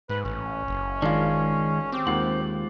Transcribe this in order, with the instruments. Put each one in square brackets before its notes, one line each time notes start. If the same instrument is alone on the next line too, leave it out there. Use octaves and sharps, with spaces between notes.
[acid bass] G#2 [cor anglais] B4
[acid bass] A1 [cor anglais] C#4
[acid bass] F#1
[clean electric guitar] D#3 G#3 [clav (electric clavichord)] D4 F4
[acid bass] C4 [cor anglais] G4
[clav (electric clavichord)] D#2 [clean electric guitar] G#3 F4 F#5